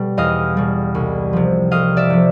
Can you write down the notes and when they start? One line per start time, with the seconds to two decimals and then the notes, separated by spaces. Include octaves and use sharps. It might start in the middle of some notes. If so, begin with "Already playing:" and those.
Already playing: B2 G3
0.17 E2 D#5 F5
0.57 B2 G3
0.95 C2
1.33 C3 F3
1.71 C2 D#5 F5
1.97 D5 E5
2.10 C3 F3